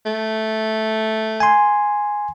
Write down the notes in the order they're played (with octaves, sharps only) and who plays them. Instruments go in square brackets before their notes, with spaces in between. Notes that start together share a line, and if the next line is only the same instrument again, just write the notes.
[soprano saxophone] A3
[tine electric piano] G#5 C6